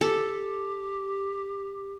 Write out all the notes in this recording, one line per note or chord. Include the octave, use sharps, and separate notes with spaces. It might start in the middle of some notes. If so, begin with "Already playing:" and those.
G4 A4